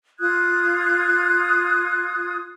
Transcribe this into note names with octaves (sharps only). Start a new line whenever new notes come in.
F4 D#6 F#6 G#6